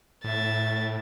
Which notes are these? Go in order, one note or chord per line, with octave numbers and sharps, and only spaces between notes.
A2 E5 A6